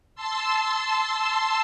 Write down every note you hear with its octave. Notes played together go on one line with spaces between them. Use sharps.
A5 C6 E6